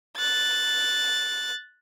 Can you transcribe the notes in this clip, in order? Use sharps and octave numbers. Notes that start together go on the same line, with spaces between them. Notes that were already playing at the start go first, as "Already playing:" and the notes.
F#6 A6